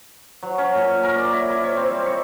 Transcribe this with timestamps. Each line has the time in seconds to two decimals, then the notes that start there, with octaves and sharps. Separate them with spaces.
0.43 F#3
0.58 C#4
0.75 A#2
1.03 A#4
1.16 D5
1.33 E4
1.50 E4
1.64 C#5
1.77 C4
1.90 G3
2.06 C#6